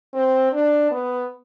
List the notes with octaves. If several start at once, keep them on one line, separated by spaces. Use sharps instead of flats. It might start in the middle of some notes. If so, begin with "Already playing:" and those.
C4
D4
B3